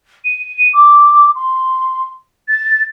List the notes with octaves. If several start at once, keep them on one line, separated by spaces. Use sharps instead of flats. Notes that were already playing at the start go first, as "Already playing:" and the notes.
D#7
D6
C6
A6